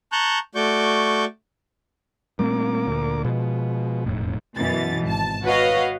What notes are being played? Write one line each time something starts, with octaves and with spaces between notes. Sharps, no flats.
A5 A#5 C#6 F#6 G6
A3 F#4 D5 C#6 G6
A#2 G3 A3 C4 A#4 D6
D2
B2 F3 G#3 B3
E1 F2 A2
F#2 B2 E3 A6
G#1 A5
F#4 B4 C#5 D#5 F5